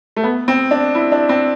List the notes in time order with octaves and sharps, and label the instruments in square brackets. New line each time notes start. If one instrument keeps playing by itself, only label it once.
[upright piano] A3
B3
C4
D4
E4
D4
C4